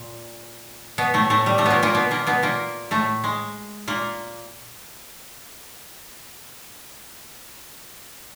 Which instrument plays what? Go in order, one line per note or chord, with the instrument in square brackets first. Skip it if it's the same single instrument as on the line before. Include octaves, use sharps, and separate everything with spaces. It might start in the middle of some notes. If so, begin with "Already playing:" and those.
Already playing: [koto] A#2
B2 B3
A2 A3
A2 A3
G3
A2 A3
A#2 A#3 B3
A#2 A#3
B2 B3
A#2 A#3
B2 B3
A#2 A#3
A2 A3
G#3
A#2 A#3